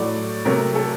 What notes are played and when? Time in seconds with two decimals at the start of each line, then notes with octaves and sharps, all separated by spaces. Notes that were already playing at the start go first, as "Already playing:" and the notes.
Already playing: A2 F#3 A3 D5
0.45 C3 F#3 A3 A#4
0.75 A4